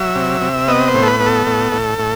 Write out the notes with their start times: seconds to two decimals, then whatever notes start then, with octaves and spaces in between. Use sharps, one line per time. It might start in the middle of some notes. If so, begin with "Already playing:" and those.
Already playing: F#3 E5
0.16 C3
0.41 C3
0.68 B3 D#5
0.88 C5
0.94 A2
1.03 A4
1.08 B4
1.20 B3
1.26 A4
1.47 A2
1.72 A2
1.99 A2